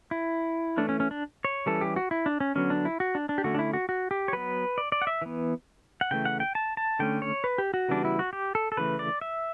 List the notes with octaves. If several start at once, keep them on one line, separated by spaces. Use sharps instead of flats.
E4
E3 A3 C#4 D4
C#4
C#4
D4
C#5
E3 G3 C#4 A4
G4
F#4
E4
D4
C#4
D3 F#3 B3 C#4
D4
E4
F#4
D4
D4
G4
D3 A3 C#4 F#4
D4
E4
F#4
F#4
G4
C#5
F#3 B3 B4
D5
D5
F#5
E5
E3 B3
F#5
C#3 E3 A3 G5
F#5
G5
A5
A5
D3 A3 C#4 G5
C#5
B4
G4
F#4
C#3 E3 G3 B3 D4
E4
F#4
G4
A4
A4
C#3 E3 A3 B4
D5
E5